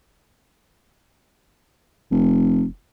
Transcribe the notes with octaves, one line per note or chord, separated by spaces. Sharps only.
F1